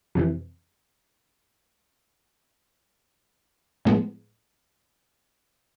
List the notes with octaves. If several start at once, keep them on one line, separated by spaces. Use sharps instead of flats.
F2 C3 E3
A2 F3 G#3 B3